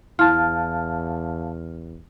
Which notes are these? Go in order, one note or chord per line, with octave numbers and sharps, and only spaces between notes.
E2 E4 F5 A5 F6